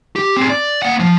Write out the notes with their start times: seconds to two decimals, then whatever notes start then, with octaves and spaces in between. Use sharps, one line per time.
0.16 G4
0.37 C4 G#4
0.50 D5
0.83 A#3 F#5
1.00 F3